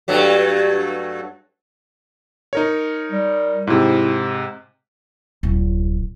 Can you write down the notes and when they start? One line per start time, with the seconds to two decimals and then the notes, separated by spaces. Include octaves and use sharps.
0.08 G2 F#3 A3
2.53 D#4 A#4 C#5
3.12 G3
3.67 G#2 C3 E4
5.43 D1 A#1